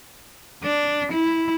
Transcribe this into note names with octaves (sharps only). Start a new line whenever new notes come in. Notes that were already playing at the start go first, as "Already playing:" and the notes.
D4
E4